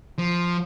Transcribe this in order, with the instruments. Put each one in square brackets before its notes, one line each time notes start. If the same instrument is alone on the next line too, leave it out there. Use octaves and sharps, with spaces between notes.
[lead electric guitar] F3